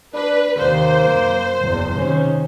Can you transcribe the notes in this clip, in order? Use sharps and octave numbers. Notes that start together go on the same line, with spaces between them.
D4 B4
D#2 C3 A#3 C5
F#2
F#1 E2
C3 D#3 C#4